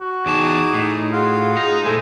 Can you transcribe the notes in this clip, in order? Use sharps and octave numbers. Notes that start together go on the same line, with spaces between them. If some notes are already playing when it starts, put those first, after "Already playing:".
F#4
E2 D#4 G#4 A5 D6 D#6
A2
F4 F#4 G#4 F5
D#4
A#2 G#3 A3 E4 G#4 A4 C5